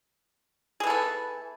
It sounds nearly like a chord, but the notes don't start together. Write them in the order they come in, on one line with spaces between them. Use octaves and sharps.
G#4 E3 A4 B3